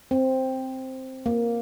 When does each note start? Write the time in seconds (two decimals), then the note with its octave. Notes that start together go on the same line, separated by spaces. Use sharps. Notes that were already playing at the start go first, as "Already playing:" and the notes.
0.11 C4
1.26 A#3